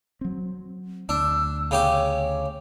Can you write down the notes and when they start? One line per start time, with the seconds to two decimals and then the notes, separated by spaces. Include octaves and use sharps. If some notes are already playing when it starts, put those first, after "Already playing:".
0.21 F#3 C4
1.09 D2 D4 E6
1.71 C#3 G4 C#5 D6